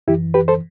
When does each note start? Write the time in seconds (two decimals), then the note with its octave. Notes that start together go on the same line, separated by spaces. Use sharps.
0.08 F#2 E3 E4 G4
0.34 G4 B4
0.48 A4 C5